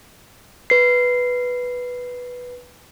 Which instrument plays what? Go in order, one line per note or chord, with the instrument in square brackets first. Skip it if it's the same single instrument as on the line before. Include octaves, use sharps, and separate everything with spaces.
[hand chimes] B4 C7